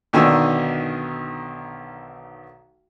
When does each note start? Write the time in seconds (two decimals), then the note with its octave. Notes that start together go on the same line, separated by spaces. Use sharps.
0.13 B1 D3 D#3 A3 G#5 E6